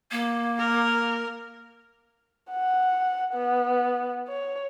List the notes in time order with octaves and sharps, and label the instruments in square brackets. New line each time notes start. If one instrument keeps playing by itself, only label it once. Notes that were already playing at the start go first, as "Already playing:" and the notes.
[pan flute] A#3
[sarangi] A#4
[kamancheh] F#5
B3
C#5